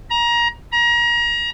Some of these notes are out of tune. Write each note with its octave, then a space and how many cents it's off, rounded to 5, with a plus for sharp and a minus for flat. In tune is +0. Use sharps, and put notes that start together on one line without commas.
A#5 +25
A#5 +30